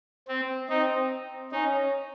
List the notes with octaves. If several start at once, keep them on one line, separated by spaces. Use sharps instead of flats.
C4
C4 D#4
C#4 D#4